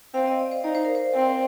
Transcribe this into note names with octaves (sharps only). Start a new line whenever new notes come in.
C4 F5
D#5
D5
C5
D#4 D5
C5
A#4
C5
C4